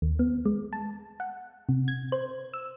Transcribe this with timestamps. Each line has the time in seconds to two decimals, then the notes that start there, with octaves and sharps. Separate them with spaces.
0.02 D#2
0.19 B3
0.45 G#3
0.73 A5
1.20 F#5
1.69 C3
1.88 G#6
2.12 C5
2.54 E6